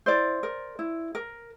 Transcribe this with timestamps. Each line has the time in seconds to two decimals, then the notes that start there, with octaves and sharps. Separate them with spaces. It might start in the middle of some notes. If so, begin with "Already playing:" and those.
0.06 E4 C5 D5
0.43 A#4
0.79 E4
1.15 A#4